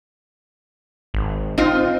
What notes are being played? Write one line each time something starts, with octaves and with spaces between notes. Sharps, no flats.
G#1
C4 D#4 F4